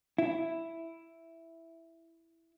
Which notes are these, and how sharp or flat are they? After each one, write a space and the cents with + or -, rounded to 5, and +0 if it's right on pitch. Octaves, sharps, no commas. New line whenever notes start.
E4 +0